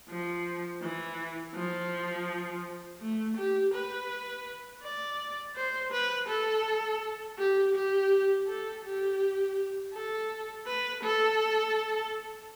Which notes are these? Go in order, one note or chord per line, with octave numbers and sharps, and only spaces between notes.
F3
E3
F3
A3
G4
B4
D5
C5
B4
A4
G4
G4
A4
G4
A4
B4
A4